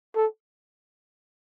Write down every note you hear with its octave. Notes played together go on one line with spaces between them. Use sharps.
A4